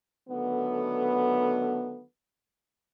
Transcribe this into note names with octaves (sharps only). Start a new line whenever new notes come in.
D3 D#3 F#3 A3 B3